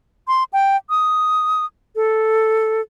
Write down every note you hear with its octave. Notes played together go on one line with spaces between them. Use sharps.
C6
G5
D#6
A4